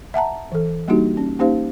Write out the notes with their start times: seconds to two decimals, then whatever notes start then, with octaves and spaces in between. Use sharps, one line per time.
0.14 E5 F#5 A5 A#5
0.52 E3 A4
0.88 G3 A#3 D4 D#4 F#4 G4
1.17 C#4
1.39 A#3 C#4 D#4 G4 C5 F5